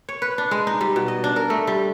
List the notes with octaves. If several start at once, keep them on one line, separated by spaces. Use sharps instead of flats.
C#5
B4
D4
G#3
D#4
G3
B2
D#5
D4
A#4
A3
G3